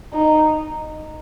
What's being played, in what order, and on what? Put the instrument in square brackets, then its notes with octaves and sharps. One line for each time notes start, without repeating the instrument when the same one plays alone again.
[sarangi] D#4